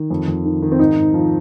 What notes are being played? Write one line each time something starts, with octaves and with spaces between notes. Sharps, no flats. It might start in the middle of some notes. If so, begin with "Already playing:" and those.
Already playing: D#3
F2
F2
D#3
D#3
C4
G#2 D#4
G#2
F3